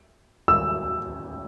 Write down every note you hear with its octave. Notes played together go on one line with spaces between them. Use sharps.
E6